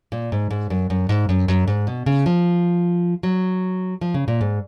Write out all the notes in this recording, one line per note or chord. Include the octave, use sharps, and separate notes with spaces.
A#2
G#2
G#2
F#2
F#2
G#2
F#2
F#2
G#2
B2
C#3
F3
F#3
F3
C#3
A#2
G#2